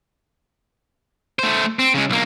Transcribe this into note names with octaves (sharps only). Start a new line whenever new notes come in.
A3 C5
C4
C#3 G#3
B1 A#3